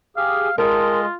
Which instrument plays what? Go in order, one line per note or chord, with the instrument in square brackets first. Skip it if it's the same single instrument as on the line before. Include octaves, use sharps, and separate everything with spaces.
[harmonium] G4 G#4 [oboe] F5
[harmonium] G#3 D#5 [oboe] F4 [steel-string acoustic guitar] A#4 G5 A5